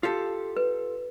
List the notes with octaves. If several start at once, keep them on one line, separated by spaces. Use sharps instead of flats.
F4 G4 A4
B4